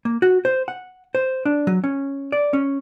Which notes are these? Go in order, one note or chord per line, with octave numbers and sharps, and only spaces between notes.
A#3
F#4
C5
F#5
C5
D4
F#3
C#4
D5
C#4